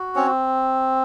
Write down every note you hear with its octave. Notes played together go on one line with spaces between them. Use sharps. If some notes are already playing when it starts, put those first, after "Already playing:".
Already playing: F#4
C4 C#4 C#5